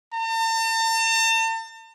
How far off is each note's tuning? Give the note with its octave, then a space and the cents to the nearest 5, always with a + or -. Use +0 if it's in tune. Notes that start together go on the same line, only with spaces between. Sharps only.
A5 +45